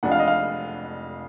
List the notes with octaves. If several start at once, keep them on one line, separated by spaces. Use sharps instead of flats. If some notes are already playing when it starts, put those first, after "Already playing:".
F1 F2 F3 G#3 D4 F#5
F5
D#5
F5